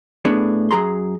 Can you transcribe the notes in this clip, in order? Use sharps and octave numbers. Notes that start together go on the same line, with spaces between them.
A2 B3 D4 G#4
F#2 F#3 G#4 A#5 C6